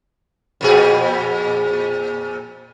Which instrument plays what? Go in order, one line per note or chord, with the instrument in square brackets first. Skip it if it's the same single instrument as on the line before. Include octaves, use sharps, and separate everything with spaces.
[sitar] F2 A#2 G#4